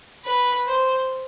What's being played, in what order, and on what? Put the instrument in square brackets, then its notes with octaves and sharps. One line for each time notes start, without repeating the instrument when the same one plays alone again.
[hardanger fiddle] B4
C5